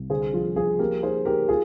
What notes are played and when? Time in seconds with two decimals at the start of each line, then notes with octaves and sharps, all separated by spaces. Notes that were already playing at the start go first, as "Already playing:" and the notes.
Already playing: C2
0.10 D3 G#4 C5
0.33 F3 F4
0.56 F3 F4 G#4
0.79 A#3 G4 A#4
1.03 D#4 G#4 C5
1.25 D#4 G4 A#4
1.49 F4 G#4